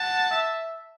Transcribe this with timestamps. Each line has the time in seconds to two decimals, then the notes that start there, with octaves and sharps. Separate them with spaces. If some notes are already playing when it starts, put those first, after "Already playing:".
Already playing: F#5 A5
0.31 E5